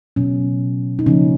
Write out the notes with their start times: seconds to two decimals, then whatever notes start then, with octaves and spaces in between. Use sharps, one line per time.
0.16 B2 F#3 B3 C#4
0.99 D#4
1.06 C#3 F3 A#3 C#4